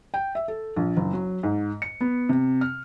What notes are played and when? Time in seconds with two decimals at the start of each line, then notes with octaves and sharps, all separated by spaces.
0.14 G5
0.35 E5
0.48 A4
0.76 A#1
0.96 F#1
1.13 F#3
1.43 G#2
1.82 C#7
2.01 B3
2.29 C3
2.61 F6